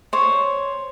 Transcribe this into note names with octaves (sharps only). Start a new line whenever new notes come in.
C5 C#5